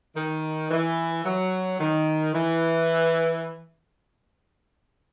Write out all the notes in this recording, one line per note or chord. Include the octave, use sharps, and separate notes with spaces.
D#3
E3
F#3
D#3
E3